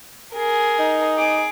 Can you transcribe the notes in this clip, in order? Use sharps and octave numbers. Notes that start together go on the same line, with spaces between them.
G#4 A#4
D#4
G#4 D6